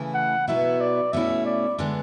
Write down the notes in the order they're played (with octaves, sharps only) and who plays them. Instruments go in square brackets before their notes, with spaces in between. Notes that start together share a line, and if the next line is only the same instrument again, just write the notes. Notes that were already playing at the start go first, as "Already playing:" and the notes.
Already playing: [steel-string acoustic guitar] C#3 E3 A3 E4
[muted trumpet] F#5
[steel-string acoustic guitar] B2 F#3 B3 E4 [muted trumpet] E5
[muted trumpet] D5
[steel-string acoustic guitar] B2 A3 C#4 E4 [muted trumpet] E5
[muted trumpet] D5
[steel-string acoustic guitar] D3 G#3 B3 D4